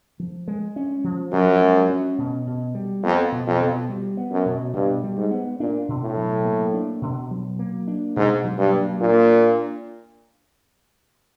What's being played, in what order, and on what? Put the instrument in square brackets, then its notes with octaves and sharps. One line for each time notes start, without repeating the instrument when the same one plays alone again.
[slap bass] F3
G#3
C#4
F3
[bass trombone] F#2 [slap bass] F3
[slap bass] G#3
C#4
B2
B2
G3
[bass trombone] F2 [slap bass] B3
[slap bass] B2
[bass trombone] F2
[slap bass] B2
G3
B3
[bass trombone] F#2
[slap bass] B2
[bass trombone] G2 [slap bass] B2
[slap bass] G3
[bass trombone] G#2
[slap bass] B3
[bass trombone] A#2 [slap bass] D4
[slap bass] B2
[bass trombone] A2
[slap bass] F#3
A#3
D4
B2
F#3
A#3
D4
[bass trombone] G#2 [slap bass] B2
[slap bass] F#3
[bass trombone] G2
[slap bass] A#3
[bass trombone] A#2 [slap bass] D4